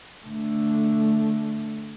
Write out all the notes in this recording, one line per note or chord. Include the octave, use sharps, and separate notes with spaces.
D3 A3